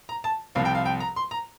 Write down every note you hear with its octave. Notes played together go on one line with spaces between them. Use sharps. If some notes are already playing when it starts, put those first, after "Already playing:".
A#5
A5
C2 C3 F3 F5
G5
F5
G5
A#5
C6
A#5